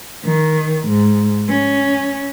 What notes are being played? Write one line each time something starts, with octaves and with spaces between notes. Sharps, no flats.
D#3
G#2
C#4